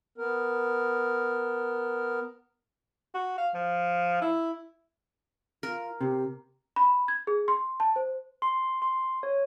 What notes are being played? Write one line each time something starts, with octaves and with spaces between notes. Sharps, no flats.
B3 A#4
F#4
F5
F3
E4
F4 A#4
C3 G4
B5
G#6
G#4
C6
A5
C5
C6
C6
C#5